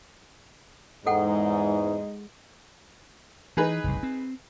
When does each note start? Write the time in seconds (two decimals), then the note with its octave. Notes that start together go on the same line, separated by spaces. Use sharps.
1.06 E2 G#2 G#3 D#4 A4 F#5 G5
3.57 E3 D#4 G#4 B4
3.84 F#1 C2
4.03 C4